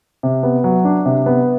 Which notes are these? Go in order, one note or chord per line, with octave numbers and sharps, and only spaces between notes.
C3
B3
F#3
D4
C3
B3